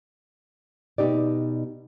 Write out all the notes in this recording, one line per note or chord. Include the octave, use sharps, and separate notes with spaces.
B2 D#4 G4 D5